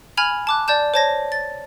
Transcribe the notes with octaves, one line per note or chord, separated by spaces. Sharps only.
G#5 B5 F6 G#6 F7
A5 D6 F#6
D5 A5 G6 E7
C5 C#5 A5 G#6 A#6
A6